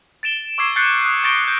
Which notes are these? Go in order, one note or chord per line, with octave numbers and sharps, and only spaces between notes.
A6 D7 E7 G7
C#6 D6 E6 G#6 C7 D7
C#6 F#6 G6 A6 C7 C#7
D#6 F#6
C#6 G6 A6 A#6 D7 G7
F#6 G6